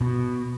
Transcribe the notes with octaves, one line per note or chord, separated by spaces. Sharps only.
B2